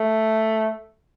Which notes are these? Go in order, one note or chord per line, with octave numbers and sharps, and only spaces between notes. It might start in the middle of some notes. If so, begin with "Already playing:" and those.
Already playing: A3